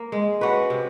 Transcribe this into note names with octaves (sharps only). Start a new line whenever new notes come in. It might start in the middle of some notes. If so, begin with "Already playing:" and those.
Already playing: A#3
G#3
C#4 F#4 B4
C3